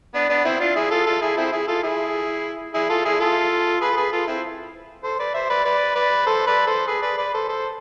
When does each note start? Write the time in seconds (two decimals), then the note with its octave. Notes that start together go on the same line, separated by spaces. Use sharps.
0.14 B3 D4
0.29 B3 D4
0.45 C4 E4
0.60 D4 F4
0.76 E4 G#4
0.91 F4 A4
1.06 F4 A4
1.21 E4 G#4
1.37 C4 E4
1.52 E4 G#4
1.67 F4 A4
1.83 E4 G#4
2.74 E4 G#4
2.89 F4 A4
3.05 E4 G#4
3.20 F4 A4
3.81 G#4 B4
3.91 A4
3.97 G#4 B4
4.12 F4 A4
4.27 C4 E4
5.04 A4 C5
5.19 B4 D5
5.34 C5 E5
5.50 B4 D5
5.65 B4 D5
5.95 B4 D5
6.26 A4 C5
6.47 B4 D5
6.67 A4 C5
6.87 G#4 B4
7.02 B4 D5
7.18 B4 D5
7.34 A4 C5
7.49 A4 C5